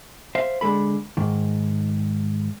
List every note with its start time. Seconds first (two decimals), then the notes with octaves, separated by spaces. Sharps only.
0.35 C5 E5 F5
0.61 D3 G#3 A4 B5
1.17 G#2 D#3